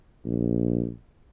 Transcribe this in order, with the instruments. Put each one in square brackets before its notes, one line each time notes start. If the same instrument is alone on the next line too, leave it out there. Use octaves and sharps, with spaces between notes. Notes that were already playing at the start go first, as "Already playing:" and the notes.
[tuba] A#1